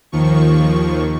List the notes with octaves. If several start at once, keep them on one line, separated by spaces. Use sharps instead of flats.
D#2 D#3 F3 C#6